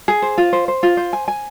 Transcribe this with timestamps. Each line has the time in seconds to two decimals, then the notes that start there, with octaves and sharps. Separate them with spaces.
0.08 G#4
0.22 C5
0.38 F4
0.53 C5
0.68 C5
0.83 F4
0.97 C5
1.13 G#5
1.28 G#5